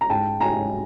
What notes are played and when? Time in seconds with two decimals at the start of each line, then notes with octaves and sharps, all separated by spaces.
0.01 A#5
0.10 G#2 G5 A5
0.41 G#5 A#5
0.56 G#2